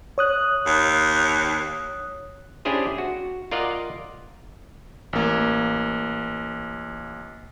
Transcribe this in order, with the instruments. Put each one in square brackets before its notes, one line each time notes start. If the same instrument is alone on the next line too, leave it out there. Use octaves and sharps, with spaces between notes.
[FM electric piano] C#5 D#6 F#6
[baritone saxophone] D#2
[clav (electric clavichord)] C#4 D4 E4 G4 G#4 C5
F#4
F4 A#4 D5 D#5 F5 F#5
[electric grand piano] A1 A#3